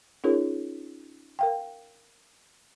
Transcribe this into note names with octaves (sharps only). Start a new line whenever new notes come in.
C#4 D#4 F4 G#4 A#4 C#5
A#4 F5 G5